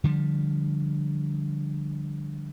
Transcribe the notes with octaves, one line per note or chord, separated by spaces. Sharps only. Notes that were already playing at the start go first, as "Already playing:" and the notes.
D3 F3 G3